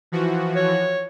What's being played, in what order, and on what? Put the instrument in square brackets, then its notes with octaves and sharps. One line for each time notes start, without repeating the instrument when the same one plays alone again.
[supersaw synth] E3 F3 F#4
[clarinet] C#5